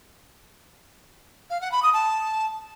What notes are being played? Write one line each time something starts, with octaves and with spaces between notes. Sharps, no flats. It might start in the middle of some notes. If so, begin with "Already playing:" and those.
F5
F#5
B5
D#6
A5